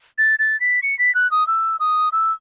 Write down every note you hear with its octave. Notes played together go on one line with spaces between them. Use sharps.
A6
A6
B6
C#7
B6
F#6
D#6
E6
D#6
E6